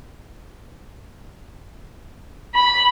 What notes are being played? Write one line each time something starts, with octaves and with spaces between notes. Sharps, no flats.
B5